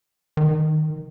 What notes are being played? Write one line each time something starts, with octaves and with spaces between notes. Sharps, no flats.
D#3